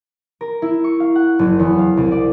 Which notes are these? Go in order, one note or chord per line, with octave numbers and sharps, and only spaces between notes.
A#4
E4
C#6
F5
F#5
F#1
E2
F5
C2
D5